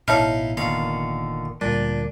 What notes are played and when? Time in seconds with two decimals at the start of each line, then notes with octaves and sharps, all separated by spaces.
0.08 A1 B2 D#4 E4 C#5 F5 A5 F6
0.57 F1 A#2 D3 D#3 B3 F5
1.61 D2 A#2 G3 D4